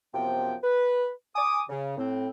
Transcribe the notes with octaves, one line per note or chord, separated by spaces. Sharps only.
F#2 C3 F3 B3 G5
B4
G#5 D6 D#6
C#3
A2 C4